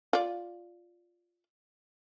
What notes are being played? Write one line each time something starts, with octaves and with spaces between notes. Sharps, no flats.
F4 D5